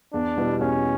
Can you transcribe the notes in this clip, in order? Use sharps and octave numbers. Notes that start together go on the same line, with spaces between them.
E2 D4
B2 G3 B3 E4
E2 C#4